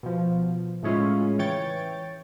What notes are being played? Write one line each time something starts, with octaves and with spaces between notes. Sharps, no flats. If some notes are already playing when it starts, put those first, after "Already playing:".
B2 F3
A2 C#3 G#3 C#4 E4 F4
E3 C#5 G5 A6